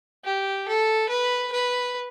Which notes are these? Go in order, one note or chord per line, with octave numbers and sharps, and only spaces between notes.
G4
A4
B4
B4